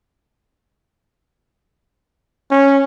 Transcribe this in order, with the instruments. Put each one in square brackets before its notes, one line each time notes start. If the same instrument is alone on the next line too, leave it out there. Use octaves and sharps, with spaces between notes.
[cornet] C#4